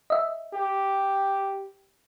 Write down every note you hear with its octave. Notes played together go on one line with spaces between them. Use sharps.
D#5 E5
G4